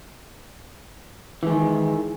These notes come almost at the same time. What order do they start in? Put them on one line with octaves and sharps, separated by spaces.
E3 G#3 D#3